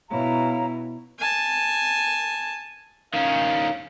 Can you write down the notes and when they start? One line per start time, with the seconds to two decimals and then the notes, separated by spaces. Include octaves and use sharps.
0.10 B2 E4 C#5 F5 A#5
1.19 G#5 A5
3.14 D#3 C#4 F5